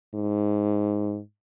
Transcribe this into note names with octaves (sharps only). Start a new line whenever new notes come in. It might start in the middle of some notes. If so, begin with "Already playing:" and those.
G#2